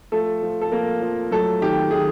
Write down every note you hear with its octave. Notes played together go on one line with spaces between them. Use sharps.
F3 A3 A4
F3
A4
F3 A#3 A#4
F3
F#3 A3 A4
D#3 G4
D#3 G#4